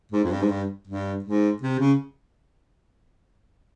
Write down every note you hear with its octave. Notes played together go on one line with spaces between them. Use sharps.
G#2
F2
G2
G#2
G2
G2
G#2
C3
C#3